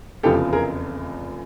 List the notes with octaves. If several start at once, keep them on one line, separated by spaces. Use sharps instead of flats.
F1 E2 C#3 F3 G4 A4
G#4 A#4